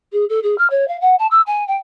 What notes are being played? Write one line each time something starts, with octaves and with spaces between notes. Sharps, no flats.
G#4
A4
G#4
F6
C#5
F5
F#5
A5
E6
G#5
G5